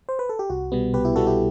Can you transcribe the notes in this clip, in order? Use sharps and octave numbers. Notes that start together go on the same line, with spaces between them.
C5
B4
A4
G4
C2 F#4
B2 G3 B3
C2 G4 B4
E4 G4
B2 G3 B3 F#4 A4
E4 G4